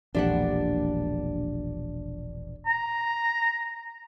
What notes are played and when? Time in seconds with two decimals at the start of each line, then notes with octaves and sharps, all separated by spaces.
0.15 E1 A#1 D4 G4 F#5
2.66 A#5